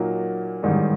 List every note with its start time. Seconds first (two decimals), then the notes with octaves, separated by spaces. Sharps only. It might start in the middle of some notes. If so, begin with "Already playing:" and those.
Already playing: A#2 F#3 A#3 D#4
0.63 A1 G#2 D#3 G3